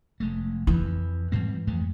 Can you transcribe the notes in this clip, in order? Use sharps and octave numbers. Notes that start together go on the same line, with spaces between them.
F1 G#3 A3
F2 E3
G#2 G3 C4
F2 G#3 A3